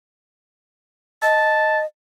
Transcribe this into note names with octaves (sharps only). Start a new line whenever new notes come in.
D#5 A5